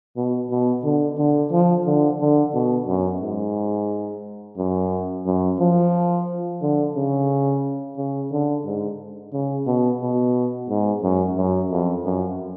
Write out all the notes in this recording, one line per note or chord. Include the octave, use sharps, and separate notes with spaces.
B2
B2
D3
D3
F3
D3
D3
B2
F#2
G#2
F#2
F#2
F3
D3
C#3
C#3
D3
G#2
C#3
B2
B2
G#2
F#2
F#2
F2
F#2